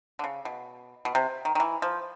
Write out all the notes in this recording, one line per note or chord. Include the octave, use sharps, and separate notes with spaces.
D3
C#3
B2
B2
C3
D#3
D#3
E3
F3